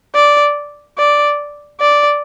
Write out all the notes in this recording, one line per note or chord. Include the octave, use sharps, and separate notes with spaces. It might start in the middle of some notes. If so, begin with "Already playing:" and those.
D5
D5
D5